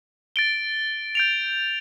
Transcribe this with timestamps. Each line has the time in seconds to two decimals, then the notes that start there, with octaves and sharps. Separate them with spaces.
0.36 A6 D7 G7
1.15 G6 D7 F7